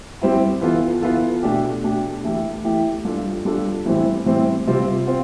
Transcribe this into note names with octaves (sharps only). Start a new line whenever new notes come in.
G3 C4 E4
E3 B3 F4 A4
E3 B3 F4 A4
B2 A3 D4 G4
B2 A3 D4 G4
E3 A3 E4 G4
E3 A3 E4 G4
G3 D4 F4 A4
G3 D4 F4 A4
A2 E3 G3 C4 E4
A2 E3 G3 C4 E4
C3 G3 C4 F4
C4 F4